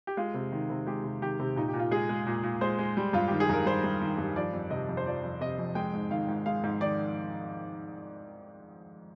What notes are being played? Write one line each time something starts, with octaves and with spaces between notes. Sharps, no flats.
G4
G#3 F4
C3
D#3
C3
G#3 G4
C3
D#3 G4
C3
A#2 D#4
G4
A#2
F4
G#3 G#4
G#3
A#2
A#2
G#3 C5
G#3
G3
G2 F4
D#3 G4
G#4
G2 A#4
G3 C5
G2
D#3
G2
F3 D5
F2
C3 D#5
F2
C5
F3 D5
F2
C3 D#5
F2
G#3 G5
G#2
D#3 F5
G#2
G#3 F5
G#2
D#3 D5